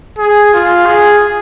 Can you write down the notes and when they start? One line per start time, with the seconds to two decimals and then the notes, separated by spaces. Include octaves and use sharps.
0.19 G#4
0.53 F4
0.86 G#4